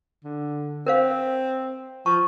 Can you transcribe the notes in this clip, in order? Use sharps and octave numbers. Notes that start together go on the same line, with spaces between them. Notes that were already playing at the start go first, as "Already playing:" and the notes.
D3
C4 A#4 C5 F5
F3 A5 C#6